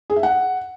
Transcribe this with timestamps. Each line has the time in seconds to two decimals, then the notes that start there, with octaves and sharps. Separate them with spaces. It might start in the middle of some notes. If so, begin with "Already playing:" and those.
0.10 G#4
0.16 E5
0.23 F#5